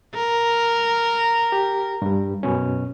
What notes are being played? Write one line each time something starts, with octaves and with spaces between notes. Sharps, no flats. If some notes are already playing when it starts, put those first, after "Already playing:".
A#4
G4
G2 G3
F#2 B2 C#4